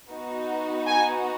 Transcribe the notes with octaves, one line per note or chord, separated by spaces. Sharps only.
B3 D#4 F#4
G#5